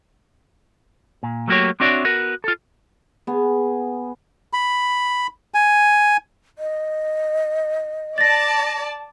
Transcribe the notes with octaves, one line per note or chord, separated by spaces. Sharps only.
A#2
F#3 A3 A#3 F#4 G4 C#5
C4 D4 F#4 C#5 D5 E5
B3 F#4 A#4
F4 A4
B3 G#4
B5
G#5
D#5
D5 A5 A6 A#6